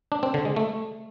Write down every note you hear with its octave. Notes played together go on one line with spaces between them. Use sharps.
D4
C4
D3
G#3
A3